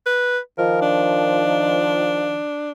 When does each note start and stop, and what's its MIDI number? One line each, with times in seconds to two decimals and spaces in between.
0.06 0.38 71
0.58 2.40 51
0.58 2.40 53
0.58 0.80 70
0.82 2.71 62